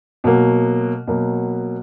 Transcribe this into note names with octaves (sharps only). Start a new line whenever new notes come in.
B2 F#3 A#3
B2 F#3 A#3